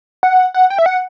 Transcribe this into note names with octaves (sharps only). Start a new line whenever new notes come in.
F#5
F#5
G5
E5
F#5